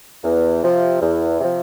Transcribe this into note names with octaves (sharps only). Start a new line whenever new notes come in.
E2
C3 F3
E2
C3 F3